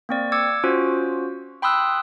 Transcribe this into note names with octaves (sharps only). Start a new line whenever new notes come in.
A#3 C4 D5
D6 E6 G#6 C#7
C#4 F4 F#4 C5
G5 B5 C6 D#6 E6 F#6